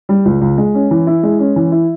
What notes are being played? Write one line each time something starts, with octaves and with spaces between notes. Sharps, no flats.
G3
C#2
C#2
G#3
C#4
E3
E4
G#3
C#4
E3
E4